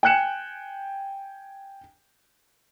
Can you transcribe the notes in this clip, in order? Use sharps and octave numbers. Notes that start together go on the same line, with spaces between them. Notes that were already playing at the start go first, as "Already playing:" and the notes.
G5 G#5 F#6 C#7 E7